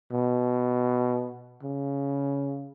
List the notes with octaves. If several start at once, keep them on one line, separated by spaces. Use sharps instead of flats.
B2
C#3